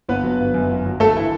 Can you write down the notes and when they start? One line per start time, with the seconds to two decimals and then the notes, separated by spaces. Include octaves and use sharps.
0.08 G1 B3 B4
0.23 F#3
0.40 G1
0.54 F#2
0.71 G1
0.86 F#3
1.00 G1 A3 A4
1.16 E3 E4